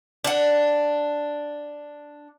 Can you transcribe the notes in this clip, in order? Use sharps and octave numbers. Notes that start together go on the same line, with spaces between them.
D4 F#5